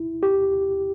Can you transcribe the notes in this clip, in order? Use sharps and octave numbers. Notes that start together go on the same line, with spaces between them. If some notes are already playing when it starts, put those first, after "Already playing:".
Already playing: E4
G4